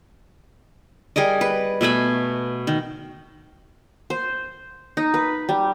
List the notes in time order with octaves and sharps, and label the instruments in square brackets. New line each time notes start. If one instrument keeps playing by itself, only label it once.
[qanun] G3 G#4 A#4 D#5
B4
B2 A3 G#5 B5
D#3
C5
D#4
B4
G3